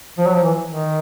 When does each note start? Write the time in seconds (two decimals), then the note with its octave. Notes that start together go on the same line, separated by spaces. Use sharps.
0.18 F3
0.26 F#3
0.34 F3
0.44 E3
0.69 D#3